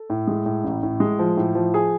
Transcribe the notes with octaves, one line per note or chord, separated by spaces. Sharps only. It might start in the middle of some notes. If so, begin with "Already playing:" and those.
Already playing: A4
A2
G#3
A2
A1
A2
G#3
F3
A2
F3
G#4